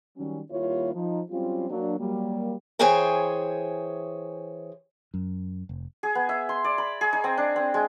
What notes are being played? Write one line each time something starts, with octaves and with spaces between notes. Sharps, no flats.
D#3 F#3 G3 C#4
D#2 G3 A#3 E4 F4 C#5
F3 D#4
F#3 G3 C4 C#4 F4
F#3 A#3 D4
F#3 G3 A#3
E3 G#4 C5 C#5 G5 G#5
F#2
F1
G#4
B3
E5
C6
D5
B5
G#4
D#4
C4
D4
C4
G#3